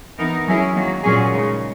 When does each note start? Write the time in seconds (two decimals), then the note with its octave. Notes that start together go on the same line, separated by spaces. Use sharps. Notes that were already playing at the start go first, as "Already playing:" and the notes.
0.17 E3 B3 D#4 A#4
0.46 F#3 C#4 E4 G#4
0.74 D#3 F#3 A#3
1.02 A#2 F#3 C#4 G#4
1.31 C#3 G#3 D#4